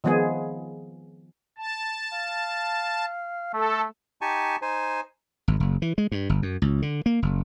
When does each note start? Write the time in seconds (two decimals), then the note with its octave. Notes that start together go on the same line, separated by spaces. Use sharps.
0.04 D#3 F3 G#3 B3 G#4
1.58 A5
2.12 F5
3.53 A3 A4
4.21 D#4 G4 G#5 A5 C#6
4.62 D#4 C5 G#5
5.48 G#1
5.60 F#1
5.82 E3
5.98 G#3
6.12 G2
6.29 G1
6.42 F#2
6.62 C#2
6.82 D3
7.06 A#3
7.22 F#1